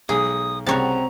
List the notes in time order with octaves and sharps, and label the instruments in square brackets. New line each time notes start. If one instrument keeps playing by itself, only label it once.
[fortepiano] B1 G#3 [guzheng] G#4 [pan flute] D#6
[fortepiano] C2 C#3 [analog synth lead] C4 [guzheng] F#4 C#5 A5 [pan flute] A#5